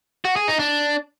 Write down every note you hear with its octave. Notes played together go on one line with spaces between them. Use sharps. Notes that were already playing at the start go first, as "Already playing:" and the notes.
F#4
G#4
D#4
D4